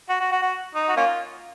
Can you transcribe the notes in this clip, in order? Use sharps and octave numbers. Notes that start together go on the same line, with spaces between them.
F#4
F#4
F#4
F#4
D#4
F#4
A#3 C#4 F4